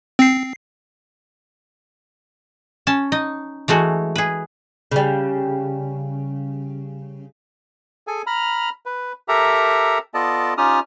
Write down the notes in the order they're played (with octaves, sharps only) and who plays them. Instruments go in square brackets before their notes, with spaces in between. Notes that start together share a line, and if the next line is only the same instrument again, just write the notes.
[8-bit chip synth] C4 C7
[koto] C#4 A5
D#4 D#5
E3 G#3 A3 F#4
G#4 B4
[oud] C#3 G3
[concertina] G#4 A4 G#5
A#5 B5 F6
B4
G4 A4 A#4 E5 A#5
B3 F4 A4 D5 D#5 A5
C#4 D#4 F4 G4 D#6 F6